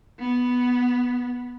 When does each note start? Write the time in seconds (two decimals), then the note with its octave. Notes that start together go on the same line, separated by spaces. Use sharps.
0.19 B3